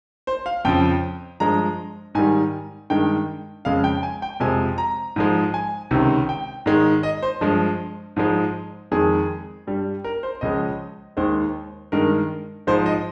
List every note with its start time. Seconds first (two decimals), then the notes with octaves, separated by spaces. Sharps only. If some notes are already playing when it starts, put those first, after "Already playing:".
0.27 C5
0.46 F5
0.65 F2 C#3 F3 G5
1.40 G2 F3 G#3 A#5
2.15 G#2 D#3 G3 G#5
2.90 G2 D#3 G#3 G5
3.65 F2 C#3 G#3 F5
3.84 G5
4.03 G#5
4.22 G5
4.40 F2 C3 F3 G#3 G#5
4.78 A#5
5.16 G#2 F3 G#3
5.54 G#5
5.91 C#2 C3 D#3
6.29 G5
6.66 G#2 D#3 G#3
7.03 D#5
7.23 C5
7.41 G2 F3 G#3
8.16 G#2 F3 G#3
8.92 F2 D#3 G#3 G#4
9.67 G2 G3
10.04 A#4
10.23 C5
10.41 C#2 C#3 F3 G#3 D#5
11.17 D#2 D#3 G#3 C5
11.92 G2 D#3 G#3 A#4
12.67 G#2 F3 G#3 C5
12.86 D#5